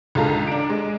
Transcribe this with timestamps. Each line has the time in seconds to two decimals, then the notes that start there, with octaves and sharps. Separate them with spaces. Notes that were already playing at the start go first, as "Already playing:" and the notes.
0.15 C#2 D3 G#3 F4 A4 A#5
0.47 D4 D7
0.70 G#3